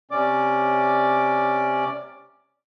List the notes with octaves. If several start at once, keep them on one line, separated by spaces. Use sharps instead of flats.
C3 C#4 D5 D6